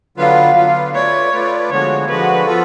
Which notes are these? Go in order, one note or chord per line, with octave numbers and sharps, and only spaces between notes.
D3 F#3 B3 F4 B4 F5
D3 F#3 B3 F4 B4
A3 F4 B4 C#5 D5
A3 F4 B4 D5
D3 F3 G#3 B3 F#4 C#5
D3 F3 G#3 B3 F#4 B4
F3 B3 F4 A4